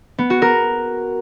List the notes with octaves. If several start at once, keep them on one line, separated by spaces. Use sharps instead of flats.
B3
F#4
A#4